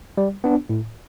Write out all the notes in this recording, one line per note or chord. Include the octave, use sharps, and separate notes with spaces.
G3
B3 D4
A2